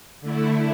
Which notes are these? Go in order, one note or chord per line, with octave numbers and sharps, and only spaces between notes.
D3 A3 E4